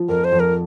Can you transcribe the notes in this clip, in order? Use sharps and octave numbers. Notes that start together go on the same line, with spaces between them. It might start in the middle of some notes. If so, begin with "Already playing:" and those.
Already playing: F3
F2 A#4
C5
F2
A#4